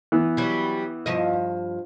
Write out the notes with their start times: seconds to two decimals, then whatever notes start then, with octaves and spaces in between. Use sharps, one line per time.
0.12 E3 B3
0.37 F#3 G3
1.06 G2 F3 D#5